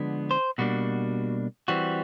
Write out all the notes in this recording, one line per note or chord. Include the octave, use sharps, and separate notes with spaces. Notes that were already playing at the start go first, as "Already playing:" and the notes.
Already playing: D3 F3 G#3 B3 D4
C5
B2 G3 A#3 D4 F#4
E3 G3 C4 F#4